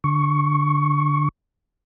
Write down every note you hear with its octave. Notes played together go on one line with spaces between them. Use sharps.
D3 C#6